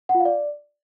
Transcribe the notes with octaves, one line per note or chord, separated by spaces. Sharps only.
F#5
F4
F5
D5